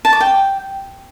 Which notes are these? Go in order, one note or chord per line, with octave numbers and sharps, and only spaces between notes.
A5
D6
G5